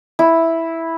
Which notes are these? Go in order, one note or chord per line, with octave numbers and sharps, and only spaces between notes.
E4